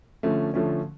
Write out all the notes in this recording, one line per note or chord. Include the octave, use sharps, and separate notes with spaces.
D3 F3 A3 C#4
D3 F3 A3 C#4